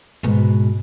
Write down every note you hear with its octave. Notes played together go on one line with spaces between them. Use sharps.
G#2 B2